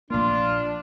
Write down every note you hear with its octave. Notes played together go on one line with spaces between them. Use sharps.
A#1 A#3 D4 F4